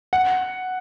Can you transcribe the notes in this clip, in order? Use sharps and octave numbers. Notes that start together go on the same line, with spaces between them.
F#5